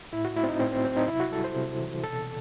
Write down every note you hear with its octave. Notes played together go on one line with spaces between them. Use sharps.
A2 E4
F#4
A3 E4
C4
D#4
A2 C4
C4
F#3 C4
D#4
C3 E4
F#4
G3 A4
C5
C3
E3
B2 A4